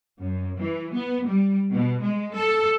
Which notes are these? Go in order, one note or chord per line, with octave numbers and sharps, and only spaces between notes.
F#2
E3
B3
G3
B2
G#3
A4